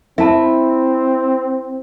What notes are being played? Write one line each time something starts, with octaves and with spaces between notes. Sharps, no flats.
C4 E4 E5 A5